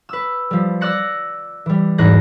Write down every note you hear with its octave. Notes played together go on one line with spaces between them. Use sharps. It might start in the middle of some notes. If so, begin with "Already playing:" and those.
B4 E6
F3 G3
D5 E6 F#6 A#6 C#7
E3 G3
E2 G#2 F#6 A#6